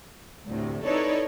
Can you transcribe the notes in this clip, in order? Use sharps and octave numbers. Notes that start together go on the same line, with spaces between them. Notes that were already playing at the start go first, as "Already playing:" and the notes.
D2 A2 C3
D#4 E4 A4 B4 C#5 D5